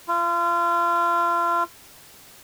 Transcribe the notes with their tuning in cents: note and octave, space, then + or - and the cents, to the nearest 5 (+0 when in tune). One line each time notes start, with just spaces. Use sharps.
F4 -35